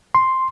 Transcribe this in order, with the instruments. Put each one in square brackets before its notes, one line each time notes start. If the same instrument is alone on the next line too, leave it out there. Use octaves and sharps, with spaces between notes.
[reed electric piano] C6